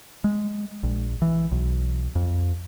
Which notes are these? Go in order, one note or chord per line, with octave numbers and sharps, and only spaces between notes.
G#3
A#1
E3
B1
F2